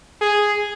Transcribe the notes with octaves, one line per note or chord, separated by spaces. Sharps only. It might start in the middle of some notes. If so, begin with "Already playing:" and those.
G#4